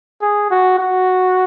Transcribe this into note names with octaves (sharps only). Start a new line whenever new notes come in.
G#4
F#4
F#4